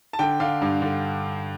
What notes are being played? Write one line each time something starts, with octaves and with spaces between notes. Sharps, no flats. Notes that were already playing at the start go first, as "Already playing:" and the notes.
A5
D3 G5
D3 F5
G2
D3